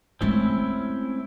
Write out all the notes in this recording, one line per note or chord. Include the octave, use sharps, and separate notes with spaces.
G#3 A3 C4 C#4 E4